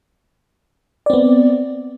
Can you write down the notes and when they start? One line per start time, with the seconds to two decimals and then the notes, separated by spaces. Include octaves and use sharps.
1.06 D5
1.10 C4
1.13 B3